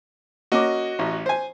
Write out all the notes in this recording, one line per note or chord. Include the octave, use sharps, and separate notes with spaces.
A#3 C#4 F#4 D#5 D6
A1
C5 G#5